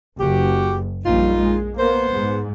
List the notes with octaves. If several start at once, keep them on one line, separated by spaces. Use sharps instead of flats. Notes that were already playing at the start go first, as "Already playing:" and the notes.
F#1 F#4 G4
A#1 G3 D#4 F4
G#3
A#3 B3 C5
G#2